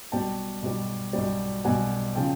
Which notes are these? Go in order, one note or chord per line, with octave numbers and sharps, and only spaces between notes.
B1 B2 G3 G5 A5
B1 B2 G3
B1 B2 G3
B1 B2 G3 F#5 G#5
C#3 F3 G5 A5